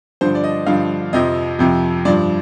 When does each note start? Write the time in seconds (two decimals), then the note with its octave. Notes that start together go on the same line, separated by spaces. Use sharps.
0.21 G2 D3 F3 C5
0.35 D5
0.44 D#5
0.66 G2 D3 F3 F5
1.13 F2 C3 F3 D#5
1.59 F2 C3 F3
2.05 G2 F3 D5